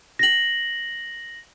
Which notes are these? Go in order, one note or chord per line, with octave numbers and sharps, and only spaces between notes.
A#6 F#7